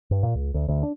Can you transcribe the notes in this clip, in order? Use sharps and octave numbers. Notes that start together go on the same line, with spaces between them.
G2
A#2
C#2
D2
D2
D4